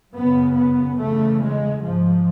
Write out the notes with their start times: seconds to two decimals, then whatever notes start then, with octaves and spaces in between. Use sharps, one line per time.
0.14 F#2 C#3 B3
0.56 B3
0.99 E2 C#3 A3
1.41 G#3
1.83 G#2 F3